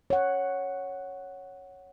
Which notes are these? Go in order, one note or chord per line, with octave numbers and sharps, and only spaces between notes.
C#5 F#5